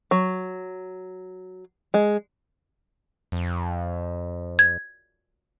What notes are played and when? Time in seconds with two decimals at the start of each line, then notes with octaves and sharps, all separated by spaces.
0.11 F#3
1.94 G#3
3.32 F2
4.59 G#6